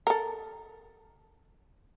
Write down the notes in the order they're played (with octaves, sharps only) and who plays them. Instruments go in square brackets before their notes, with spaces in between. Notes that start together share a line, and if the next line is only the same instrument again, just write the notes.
[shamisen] A4 A#4